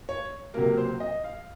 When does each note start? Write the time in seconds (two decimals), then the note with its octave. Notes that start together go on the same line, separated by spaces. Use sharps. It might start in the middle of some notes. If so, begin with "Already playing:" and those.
0.09 C#5
0.54 C#2 C3 F#3 A#3 A#4
0.78 C5
1.00 D#5
1.24 F5